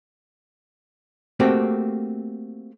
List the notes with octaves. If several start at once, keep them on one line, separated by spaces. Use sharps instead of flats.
A3 A#3 C4 F#4 G4